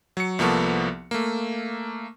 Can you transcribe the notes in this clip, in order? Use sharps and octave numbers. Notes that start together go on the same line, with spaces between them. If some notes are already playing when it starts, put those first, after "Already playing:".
F#3 C#7
C2 F3 A#3 B3 A4 C#6
A3 A#3